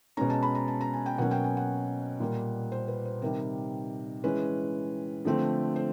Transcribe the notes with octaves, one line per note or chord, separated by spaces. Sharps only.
B2 G#3 C#4 A#5
A5
B5
A#5
A5
A#5
G#5
G5
B2 F#3 A#3 C#4 F#5
G5
G#5
F#5
A#2 G3 A#3
C5
B4
C5
C3 D#3 G3 A#4
E3 G#3 C#4 B4
D3 F3 A3 C4
C5